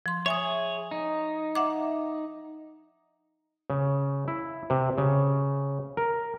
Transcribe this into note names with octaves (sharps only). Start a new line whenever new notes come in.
F3 C6
G#4 C#5 E5 G#5 D#6
D#4
E5 F#5 D6
C#3
E4
C3
C#3
A#4